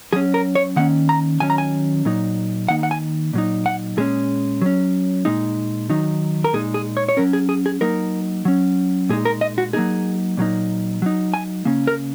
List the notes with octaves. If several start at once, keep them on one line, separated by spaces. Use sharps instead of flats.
F#3 C#4 G#4
A#4
C#5
D#3 A#3 C#4 F#5
A#5
D#3 F#3 C#4 G#5
A#5
G#5
A#2 F#3 D#4
D#3 A#3 D#4 F#5
F#5
G#5
A#2 F#3 D#4
F#5
A#2 G#3 C#4 G#4
F#3 C#4
A#2 G#3 D#4
D#3 F#3 D#4
A#4
A#2 G#3 D#4 G#4
G#4
C#5
C#5
F#3 C#4 A#4
G#4
G#4
G#4
F#3 A#3 D#4 A#4
F#3 C#4
A#2 G#3 D#4 G#4
A#4
D#5
F#4
F#3 A#3 D#4 G#4
A#2 F#3 A#3 D#4
F#3 D#4
G#5
C#3 A#3 C#4
A#4